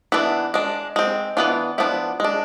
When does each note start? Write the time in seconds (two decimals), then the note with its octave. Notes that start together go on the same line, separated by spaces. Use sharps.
0.12 E3 B3 D4 E4
0.54 G#3 D4
0.96 G#3 C4
1.37 E3 B3 D4 F4
1.78 F3 B3 D4 E4
2.20 G#3 D4